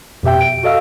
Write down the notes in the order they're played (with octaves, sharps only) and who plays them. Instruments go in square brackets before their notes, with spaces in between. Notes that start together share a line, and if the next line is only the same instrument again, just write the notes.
[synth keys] F2 B2 G4 E5 G5
D7
F#4 A4 D#5 F5 E6